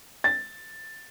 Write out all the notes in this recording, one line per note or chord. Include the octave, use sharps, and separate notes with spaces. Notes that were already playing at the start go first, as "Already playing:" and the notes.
A6